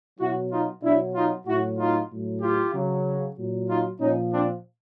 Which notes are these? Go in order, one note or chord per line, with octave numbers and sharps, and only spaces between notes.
B2 F#3 E4 F#4
D#4 F4
B2 F#3 D4 E4
D#4 F4
A2 F#3 E4 F#4
D#4 F4
A2 F#3
F4 G4
C#3 F#3
A#2 F#3
D#4 F4
A#2 F3 C#4 D#4
C4 D4